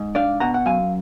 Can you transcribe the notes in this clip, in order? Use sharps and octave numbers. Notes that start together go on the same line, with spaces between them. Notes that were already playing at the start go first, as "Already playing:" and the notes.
Already playing: G#2
D4 D5 F5
B2 F#5 A#5
F#5
F#2 F5 G#5